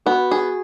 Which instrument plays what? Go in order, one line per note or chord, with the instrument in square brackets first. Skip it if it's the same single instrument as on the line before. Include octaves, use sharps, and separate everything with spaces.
[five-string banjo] B3 [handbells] F#4
[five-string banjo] G#4